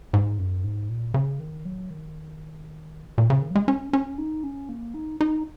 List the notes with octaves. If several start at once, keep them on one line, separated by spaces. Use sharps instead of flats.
G#2
F#2
G#2
A#2
C#3
D#3
F#3
D#3
A#2
C#3
D#3
F#3
G#3
C#4
C#4
D#4
C#4
A#3
D#4
D#4